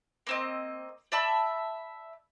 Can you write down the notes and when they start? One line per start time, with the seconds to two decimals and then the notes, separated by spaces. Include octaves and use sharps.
0.27 A#3 C4 D#5
1.12 D5 E5 A5 B5